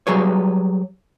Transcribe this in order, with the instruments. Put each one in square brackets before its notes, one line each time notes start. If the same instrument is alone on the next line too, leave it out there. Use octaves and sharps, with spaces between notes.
[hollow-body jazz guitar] F#3 G3 G#4 B4 C#5